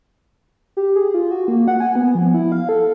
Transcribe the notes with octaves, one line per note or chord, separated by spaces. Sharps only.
G4
G#4
F4
F#4
A#3
F#5
G#5
B3
F3
E4
F5
A4